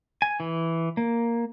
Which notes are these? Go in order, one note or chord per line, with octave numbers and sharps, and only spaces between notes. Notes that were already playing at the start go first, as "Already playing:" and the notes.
G#5
E3
A#3